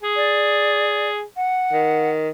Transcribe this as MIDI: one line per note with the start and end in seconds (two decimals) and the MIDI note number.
0.03 1.23 68
0.16 1.09 74
1.36 2.09 78
1.73 2.29 51